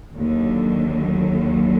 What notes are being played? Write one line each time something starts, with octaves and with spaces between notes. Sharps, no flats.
D#2 D3 F#3